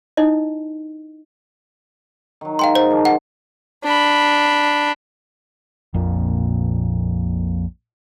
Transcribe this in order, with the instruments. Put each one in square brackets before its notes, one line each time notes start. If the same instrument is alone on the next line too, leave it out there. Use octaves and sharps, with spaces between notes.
[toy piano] D#4 E4 D#5
[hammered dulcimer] D#3 F#3
[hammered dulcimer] G#2 [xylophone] F5 G5 C6
[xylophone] C5
[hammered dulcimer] D#3 F3 A#3
[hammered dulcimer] C5 A5 A#5 [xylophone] F#5
[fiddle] D4 B5
[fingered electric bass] A#1 F2 A#2